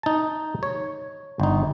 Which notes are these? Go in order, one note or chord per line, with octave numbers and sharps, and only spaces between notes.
D#4 A5
C#5
G1 D#4